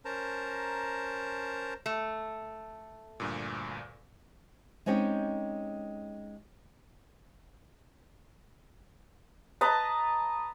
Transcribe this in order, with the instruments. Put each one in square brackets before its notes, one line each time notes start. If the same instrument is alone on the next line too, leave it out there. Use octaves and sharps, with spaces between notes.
[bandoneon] C#4 A#4 C5 A5 A#5
[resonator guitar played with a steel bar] A3
[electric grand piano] D2 G2 A#2
[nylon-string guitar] G#3 C4 C#4 D#4 G4
[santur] B4 D#5 A5 A#5